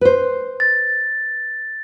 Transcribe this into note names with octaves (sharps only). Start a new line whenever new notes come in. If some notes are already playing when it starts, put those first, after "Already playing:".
B4 C5
A6